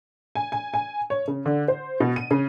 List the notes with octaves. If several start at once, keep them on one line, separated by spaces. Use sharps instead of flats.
G#5
G#5
G#5
C#5
C#3
D3
C5
B2
D#7
C#3